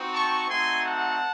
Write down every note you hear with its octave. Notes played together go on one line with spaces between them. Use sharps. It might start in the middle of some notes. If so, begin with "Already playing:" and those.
Already playing: C4 D#4 F#4
A5 C#6
A3 C4 D#4 F#4 G#5 C6
F#5 A5